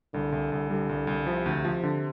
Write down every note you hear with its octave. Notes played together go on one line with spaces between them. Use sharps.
C2 D3
C2
C2
D3 G3
C2
C2
C3 F3
D2
F3
D3